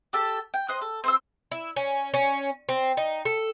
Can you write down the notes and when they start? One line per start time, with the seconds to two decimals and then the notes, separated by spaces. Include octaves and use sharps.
0.13 G4 A4 A5
0.54 G5
0.68 C5 D#5 F#6
0.82 A4
1.04 C4 C5 E6
1.52 E4
1.76 C#4
2.14 C#4
2.69 C4
2.97 D#4
3.25 A4